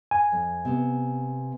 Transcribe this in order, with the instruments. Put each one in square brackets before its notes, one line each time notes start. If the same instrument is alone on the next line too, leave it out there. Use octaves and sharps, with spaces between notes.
[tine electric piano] G#5
[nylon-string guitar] F2
C3 B3